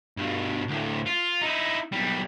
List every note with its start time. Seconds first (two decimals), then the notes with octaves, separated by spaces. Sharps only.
0.18 G2 B2
0.68 D2 A2
1.06 F4
1.41 D#4 E4
1.92 B1 G3